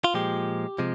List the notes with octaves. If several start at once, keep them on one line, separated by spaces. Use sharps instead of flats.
F4
A#2 F3 G#3 G4
C3 F3 G#3